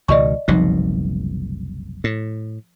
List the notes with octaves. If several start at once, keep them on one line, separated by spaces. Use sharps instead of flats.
C#2 B2 D#3 D5 D#5 C#6
F#1 C2 B2 F3 D#4
A2